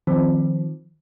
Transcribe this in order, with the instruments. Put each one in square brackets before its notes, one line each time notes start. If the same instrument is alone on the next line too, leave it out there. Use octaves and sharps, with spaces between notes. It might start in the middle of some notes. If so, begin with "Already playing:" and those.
[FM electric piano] D#3 F3 C4